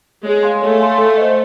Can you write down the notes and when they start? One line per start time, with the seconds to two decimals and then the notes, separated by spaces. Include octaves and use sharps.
0.25 G#3 C#5
0.43 F5 G#5 C6
0.62 A3 C#5
0.80 F5 G#5 C6
0.98 A4
1.18 C5 D#5